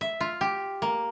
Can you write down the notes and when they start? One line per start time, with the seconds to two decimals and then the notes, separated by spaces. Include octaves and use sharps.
0.01 E5
0.20 F4
0.41 G4
0.82 A#3